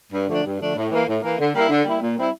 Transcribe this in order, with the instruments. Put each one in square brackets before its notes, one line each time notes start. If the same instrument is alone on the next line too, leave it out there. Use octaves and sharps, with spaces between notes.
[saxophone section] G2
D3 F3 A3 D4
G2
D3 F3 A3 D4
A2
E3 A#3
A2
E3 A#3
D3
G3 A#3 E4
D3
G3 A#3 E4
A#2
G3 C4 E4